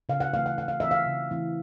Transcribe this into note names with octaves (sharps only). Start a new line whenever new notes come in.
C#3 F5
F#5
E3 A3 C4 F5
F#5
C#3 F#5
F5
E3 A3 C4 E5
F5
C#3
E3 A3 C4